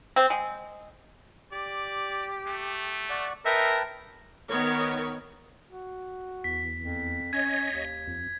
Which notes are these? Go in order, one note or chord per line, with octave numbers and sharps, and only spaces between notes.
C4
G#3
G4 D5
A3
D5 F#5 C#6
D#4 A#4 B4 E5 G5 A5
D#3 B3 A#4 C#5
F#4
E2 B6
F2
C#4 C#5 D#5 G#6
D#2
F2